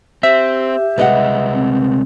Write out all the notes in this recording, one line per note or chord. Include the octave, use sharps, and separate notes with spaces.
C4 G4 E5
C2 G#3 B4 D#5 F#5
C4